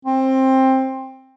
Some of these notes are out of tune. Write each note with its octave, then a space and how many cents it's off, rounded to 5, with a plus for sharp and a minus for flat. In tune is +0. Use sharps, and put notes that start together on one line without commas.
C4 +15